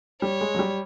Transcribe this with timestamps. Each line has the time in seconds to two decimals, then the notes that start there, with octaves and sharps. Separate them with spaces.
0.22 G3 C#5
0.41 G#3
0.55 F#3
0.59 G3